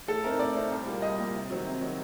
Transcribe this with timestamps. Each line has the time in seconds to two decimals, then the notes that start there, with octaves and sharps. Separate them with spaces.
0.08 A2 A4
0.24 A3 C4 D#4 A#4
0.39 A2 D5
0.55 A3 C4 D#4
0.71 C2
0.86 A#2 G3 A#3
1.02 C2 D#5
1.18 A#2 G3 A#3
1.34 C3
1.50 D#3 F#3 C4
1.66 C3
1.81 D#3 F#3 C4